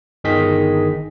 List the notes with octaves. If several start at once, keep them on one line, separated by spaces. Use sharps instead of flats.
G1 D#3 G#4 D#5 B6